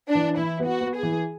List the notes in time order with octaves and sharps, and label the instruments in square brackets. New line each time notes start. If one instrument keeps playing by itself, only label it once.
[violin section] D4
[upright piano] E3
[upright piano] E3 [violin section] E4
[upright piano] B3
[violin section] F#4
[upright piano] B3
[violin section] G#4
[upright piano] E3